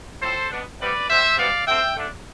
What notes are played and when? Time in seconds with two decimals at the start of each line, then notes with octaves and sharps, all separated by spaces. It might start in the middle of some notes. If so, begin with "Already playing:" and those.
0.21 A2 F3 C4 A4 C5
0.50 B2 B3 D4
0.79 C3 G3 B3 B4 D5
1.08 D3 G3 C4 C5 E5
1.37 C3 G3 B3 D4 D5 F5
1.66 D3 A3 C4 E5 G5
1.96 D3 A3 D4